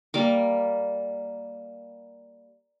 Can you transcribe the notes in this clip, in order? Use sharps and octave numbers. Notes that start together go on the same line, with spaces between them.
G3 A#3 D6